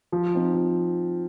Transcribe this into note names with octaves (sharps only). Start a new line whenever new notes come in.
F3
C4 D#4
F3